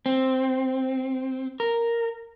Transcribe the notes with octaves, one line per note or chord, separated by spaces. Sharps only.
C4
A#4